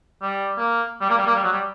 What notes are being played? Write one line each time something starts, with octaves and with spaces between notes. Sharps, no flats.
G3
A#3
G3
A#3
G3
A#3
G3
F#3
G3